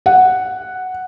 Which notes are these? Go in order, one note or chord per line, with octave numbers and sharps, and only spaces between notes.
F#5